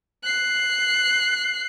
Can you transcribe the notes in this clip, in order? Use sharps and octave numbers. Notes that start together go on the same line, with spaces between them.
F#6 C7